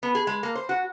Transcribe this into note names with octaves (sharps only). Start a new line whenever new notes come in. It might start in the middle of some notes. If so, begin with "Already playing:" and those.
B3
G#4
G#3
A#3
C5
F#4